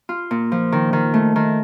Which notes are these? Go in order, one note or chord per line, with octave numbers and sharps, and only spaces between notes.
F4
A#2
F3
D#3
D#3
A3
D#3